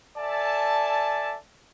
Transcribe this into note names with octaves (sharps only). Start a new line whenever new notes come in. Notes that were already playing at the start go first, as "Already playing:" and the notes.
A4 D5 E5 G#5 A5